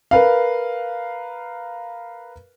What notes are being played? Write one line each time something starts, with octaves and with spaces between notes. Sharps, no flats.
A#4 B4 F5